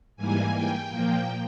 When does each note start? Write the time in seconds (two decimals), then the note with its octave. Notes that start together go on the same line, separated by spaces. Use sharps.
0.16 G#2 E3 G3 A#3 G#5
0.53 G5
0.89 A#2 F3 A#3 G5